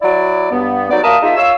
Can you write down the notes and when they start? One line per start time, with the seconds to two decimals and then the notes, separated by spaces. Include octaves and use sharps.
0.01 F#3 E4 D5
0.52 G2 B3
0.90 F#3 B3 D#4 D5
1.03 A#3 A#4 E5 A5 D#6
1.23 A#3 D#4 F4 G#4 E5
1.37 F4 C#5 F5 E6